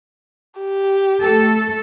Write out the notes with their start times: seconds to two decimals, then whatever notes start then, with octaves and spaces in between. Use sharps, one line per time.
0.60 G4
1.22 A3 A4